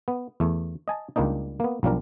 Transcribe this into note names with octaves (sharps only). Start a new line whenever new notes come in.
B3
E2 A3
D#5 G#5 A5
C#2 G3 A#3 D4 D#4
A#3 B3
B1 F3 G3 D4 A#4